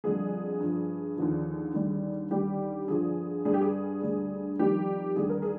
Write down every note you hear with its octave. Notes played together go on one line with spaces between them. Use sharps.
F2 D3 G3 G#4
G2 F3
D#2 D3 F3
D#2 D3 G3
D#2 D3 G3 G4
G2 D3 F3 G#4
G2 D3 G3 G#4
G4
G#4
D2 D3 G3
F2 D#3 G3 G4
D#2 D3 G3 G#4
A#4
G#4